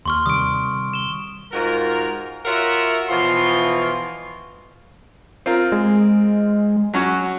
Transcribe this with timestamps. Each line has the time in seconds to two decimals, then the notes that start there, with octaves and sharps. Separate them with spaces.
0.06 D#2 C6 C#6 F6
0.26 C3 D#3 G3 D#6 D7
0.94 E7 G7
1.52 G#2 F4 F#4 A#4
2.45 F4 F#4 A#4 C#5 E5 F#5
3.09 B2 E3 F3 F4 C6
5.46 C4 F4 A#4
5.72 G#3
6.94 F#3 C#4 F#4